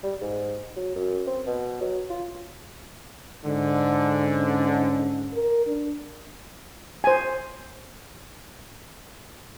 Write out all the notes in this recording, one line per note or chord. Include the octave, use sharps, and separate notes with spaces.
G3
G#2
F#3
F#2
C4
B2
F#3
F4
G#2 D3
C#4
A#4
D4
C5 G#5